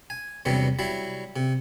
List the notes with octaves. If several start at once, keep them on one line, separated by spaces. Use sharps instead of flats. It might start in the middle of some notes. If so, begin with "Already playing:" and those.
G#5
E2 G2 C3 F#3 G3
F#3 G3 E4
C3